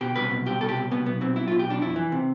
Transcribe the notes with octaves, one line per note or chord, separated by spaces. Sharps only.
B2 G4
C2 B4
B2
C2 G4
B2 A4
G4
C2
B2 B3
B1 B3
B2 C4
B1 E4
F4
B2
G4
B1 D4
F2 E4
E3
C3